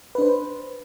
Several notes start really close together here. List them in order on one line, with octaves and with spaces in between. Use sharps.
B4 D4 C5